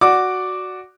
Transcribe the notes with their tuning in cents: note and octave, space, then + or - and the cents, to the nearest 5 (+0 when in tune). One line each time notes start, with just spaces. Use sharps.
F#4 +0 D5 +0 D6 +0